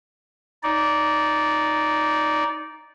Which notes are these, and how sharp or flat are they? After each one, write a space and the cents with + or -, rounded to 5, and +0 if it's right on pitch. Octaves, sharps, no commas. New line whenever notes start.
D#4 +0 D5 -15